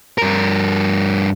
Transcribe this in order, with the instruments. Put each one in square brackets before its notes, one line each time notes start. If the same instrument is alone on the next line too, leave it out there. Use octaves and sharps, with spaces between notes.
[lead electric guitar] G2 A#4